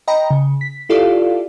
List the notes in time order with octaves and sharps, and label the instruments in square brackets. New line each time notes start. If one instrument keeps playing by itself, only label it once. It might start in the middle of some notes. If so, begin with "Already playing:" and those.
[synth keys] D#5 G5 A#5 B5
C#3
B6
E4 F4 G4 A4 D5 F5